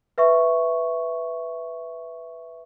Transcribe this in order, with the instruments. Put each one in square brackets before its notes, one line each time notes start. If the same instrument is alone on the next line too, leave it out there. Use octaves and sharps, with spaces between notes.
[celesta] B4 E5 C#6